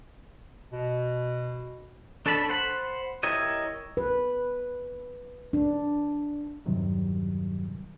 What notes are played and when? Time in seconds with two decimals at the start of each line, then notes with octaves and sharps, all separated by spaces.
0.72 B2
2.26 D4 A4 C#5 A5 B5
2.49 C5 F#5 B5
3.23 E4 G4 A#4 C#5 D#5
3.97 B4
5.53 D4
6.66 E2 G2 C3 D#3 F#3 G3